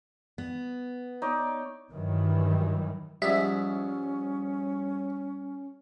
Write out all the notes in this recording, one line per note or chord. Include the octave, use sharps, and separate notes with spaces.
B3
D#4 C#5 D5
G2 D#3 E3 F#3
G#2 F3 G3 G#3 C#4 E5